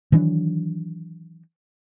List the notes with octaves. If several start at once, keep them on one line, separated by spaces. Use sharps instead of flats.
D#3 E3 F#3 D4